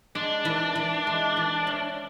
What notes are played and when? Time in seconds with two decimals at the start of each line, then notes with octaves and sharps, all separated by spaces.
0.15 G#3 D4
0.45 E3
0.75 E3
1.07 G#3
1.37 E3
1.67 C#4